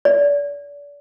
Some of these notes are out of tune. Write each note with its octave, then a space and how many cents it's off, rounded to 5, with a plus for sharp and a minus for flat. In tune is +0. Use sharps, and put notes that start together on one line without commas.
D5 -35